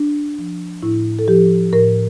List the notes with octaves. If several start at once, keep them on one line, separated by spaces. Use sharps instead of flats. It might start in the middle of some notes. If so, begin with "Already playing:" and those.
Already playing: D4
F3
A2 E4
A4
F3 G4
A2 A#4